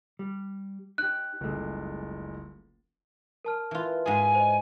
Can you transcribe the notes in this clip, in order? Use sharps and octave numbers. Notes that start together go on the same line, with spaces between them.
G3
D#4 G4 F#6
F#1 C#2 G3 A3 G#4
A#4 A5 F6
E3 F4
G#2 G#4 G#5
C5 D#5